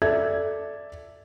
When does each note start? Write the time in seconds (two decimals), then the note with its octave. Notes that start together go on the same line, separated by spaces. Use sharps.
0.02 A4 D5 E5 G#6